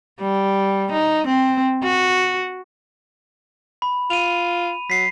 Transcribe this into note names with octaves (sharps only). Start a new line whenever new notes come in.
G3
D#4
C4
F#4
B5
F4 D#7 F7
F#3 B6 C7